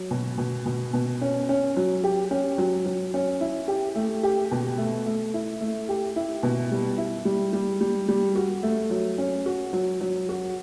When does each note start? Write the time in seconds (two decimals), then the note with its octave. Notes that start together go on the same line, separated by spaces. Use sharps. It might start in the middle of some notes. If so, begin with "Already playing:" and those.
Already playing: F#3
0.11 B2
0.38 B2
0.66 B2
0.93 B2
1.21 C#4
1.49 C#4
1.77 F#3
2.04 G4
2.31 C#4
2.58 F#3
2.86 F#3
3.14 C#4
3.41 E4
3.68 G4
3.95 A3
4.23 G4
4.51 B2
4.78 A3
5.06 A3
5.34 E4
5.61 A3
5.89 G4
6.16 E4
6.43 B2
6.71 G3
6.98 E4
7.25 G3
7.53 G3
7.81 G3
8.08 G3
8.35 F#4
8.63 A3
8.90 F#3
9.18 C#4
9.46 F#4
9.73 F#3
10.01 F#3
10.29 F#4